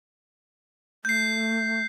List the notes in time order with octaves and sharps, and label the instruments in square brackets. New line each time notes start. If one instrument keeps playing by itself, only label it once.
[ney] A3 [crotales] G6 C7